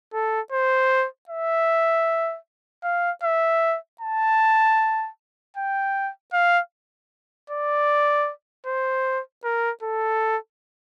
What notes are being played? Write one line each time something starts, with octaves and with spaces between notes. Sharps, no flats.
A4
C5
E5
F5
E5
A5
G5
F5
D5
C5
A#4
A4